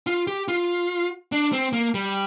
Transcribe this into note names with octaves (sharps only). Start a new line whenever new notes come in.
F4
G4
F4
D4
C4
A#3
G3